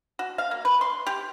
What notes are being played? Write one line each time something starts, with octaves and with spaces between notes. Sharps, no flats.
F#4
F5
A#3
B4
C6
G4